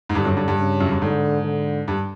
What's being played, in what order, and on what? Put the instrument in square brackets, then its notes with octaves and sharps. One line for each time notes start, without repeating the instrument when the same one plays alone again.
[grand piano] G#2
[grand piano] G2 [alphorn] D3
[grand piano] F#2
G2
G2
[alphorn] C#3
[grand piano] F#2
G2
[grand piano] G#2 [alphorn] D3
[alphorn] D3
[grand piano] G2